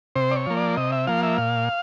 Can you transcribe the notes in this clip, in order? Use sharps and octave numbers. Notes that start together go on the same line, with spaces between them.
C3 C5
D5
C#5
F3 A#3
D5
C3 D#5
E5
F3 A#3 F5
E5
A#2 F5